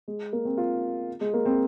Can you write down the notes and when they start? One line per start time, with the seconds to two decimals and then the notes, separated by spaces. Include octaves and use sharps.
0.08 G#3
0.33 A#3
0.45 C4
0.57 F4
1.21 G#3
1.34 A#3
1.45 C4